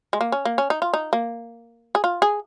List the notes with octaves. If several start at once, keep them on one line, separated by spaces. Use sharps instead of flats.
G#3
A#3
C#4
A#3
C#4
D#4
F4
D#4
A#3
G#4
F4
G#4